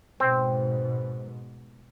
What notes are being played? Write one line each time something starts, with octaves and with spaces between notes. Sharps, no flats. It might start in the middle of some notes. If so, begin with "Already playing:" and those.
G#2 B2 C4